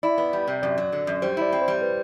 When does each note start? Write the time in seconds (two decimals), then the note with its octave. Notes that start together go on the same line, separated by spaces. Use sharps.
0.03 E4 D5
0.18 B3
0.33 G3
0.47 C3
0.62 F#2 D5
0.78 F#3
0.93 D3
1.07 F#2
1.22 G3 C5
1.37 E4 D5
1.52 C4
1.62 C5
1.68 G3
1.82 B4